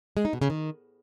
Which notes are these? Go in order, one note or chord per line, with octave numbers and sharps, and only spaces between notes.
G#3
D#4
B2
C#3
D#3